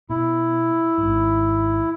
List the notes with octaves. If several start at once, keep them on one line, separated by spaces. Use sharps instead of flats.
B2 E4
G#1 G#2